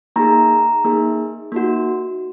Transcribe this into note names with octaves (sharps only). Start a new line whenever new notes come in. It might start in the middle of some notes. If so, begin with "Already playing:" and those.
A#3 D#4 G#4 A#5
A#3 D#4 G#4
A#3 D#4 F#4